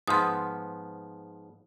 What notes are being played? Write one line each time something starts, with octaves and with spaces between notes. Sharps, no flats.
G#2 F3 B3 C6 D#6